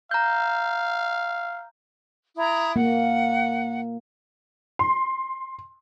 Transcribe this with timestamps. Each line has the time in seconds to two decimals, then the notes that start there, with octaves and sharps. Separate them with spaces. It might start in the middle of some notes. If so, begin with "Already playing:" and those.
0.11 F5 A#5 G6
2.37 E4 A#5 D#6
2.76 A#3 F#5
4.79 C6